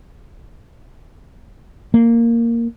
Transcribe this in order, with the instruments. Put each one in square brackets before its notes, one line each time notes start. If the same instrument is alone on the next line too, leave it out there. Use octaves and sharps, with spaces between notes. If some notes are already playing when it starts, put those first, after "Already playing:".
[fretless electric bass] A#3